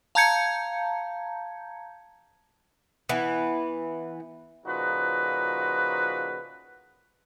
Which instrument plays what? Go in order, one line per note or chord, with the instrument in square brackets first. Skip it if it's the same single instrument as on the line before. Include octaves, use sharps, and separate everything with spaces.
[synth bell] F5 A5 A#5 G6 G#6 C#7
[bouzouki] E3 B3
[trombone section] A#2 C#3 F3 D#4 F#4 B4